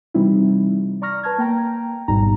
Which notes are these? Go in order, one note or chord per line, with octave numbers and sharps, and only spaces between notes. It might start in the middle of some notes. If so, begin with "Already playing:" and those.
C3 E3 G3 C4 D#4 E4
D5 A#5 C#6 F6 A#6
B4 A5 F6 G#6
A#3 G5 A#5
A1 G#2 B2 G3 D#4 A#5